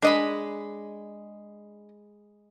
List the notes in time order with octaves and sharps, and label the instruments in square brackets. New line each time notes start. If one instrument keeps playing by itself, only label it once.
[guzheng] G#3 B5 [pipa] D4 D#5